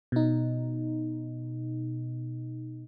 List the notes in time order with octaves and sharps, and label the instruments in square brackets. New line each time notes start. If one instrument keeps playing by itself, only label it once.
[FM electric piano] B2 D#4